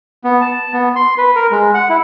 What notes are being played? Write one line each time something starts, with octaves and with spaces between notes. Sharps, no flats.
B3
A5
B3
C6
B4
A#4
G#3
F#5
E4